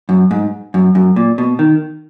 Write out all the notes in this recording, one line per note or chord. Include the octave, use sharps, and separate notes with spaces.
F#2
G#2
F#2
F#2
A#2
B2
D#3